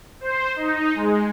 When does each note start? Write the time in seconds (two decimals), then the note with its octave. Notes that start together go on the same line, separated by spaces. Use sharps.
0.21 C5
0.56 D#4
0.95 G#3